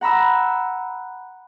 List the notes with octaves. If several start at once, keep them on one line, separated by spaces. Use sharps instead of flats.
F#5 A#5 B5 E6